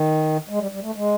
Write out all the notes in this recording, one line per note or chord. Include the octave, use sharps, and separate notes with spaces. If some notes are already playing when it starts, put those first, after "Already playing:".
Already playing: D#3
G#3
G3
G3
A3
G#3